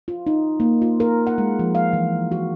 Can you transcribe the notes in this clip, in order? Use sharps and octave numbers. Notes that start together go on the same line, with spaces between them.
F4
D#4
A#3
F4
A#4
F#5
G#3
F3
F5
E3
F#4